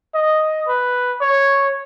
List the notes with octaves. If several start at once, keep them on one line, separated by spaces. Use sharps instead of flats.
D#5
B4
C#5